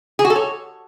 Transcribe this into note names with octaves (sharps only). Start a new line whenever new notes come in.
G#4
F#4
A4
C#5